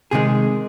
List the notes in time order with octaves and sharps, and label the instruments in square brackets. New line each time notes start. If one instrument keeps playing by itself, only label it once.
[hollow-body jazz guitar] C3 D#3 G#3 G#4